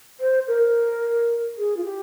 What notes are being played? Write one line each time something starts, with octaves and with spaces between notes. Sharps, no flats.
C5
A#4
G#4
F4
G4